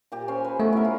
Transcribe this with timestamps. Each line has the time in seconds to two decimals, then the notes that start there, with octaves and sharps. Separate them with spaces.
0.12 A#2 G4
0.28 C#4 C5 G#5
0.44 B4
0.60 B2 A3
0.73 E4 A#4
0.85 F4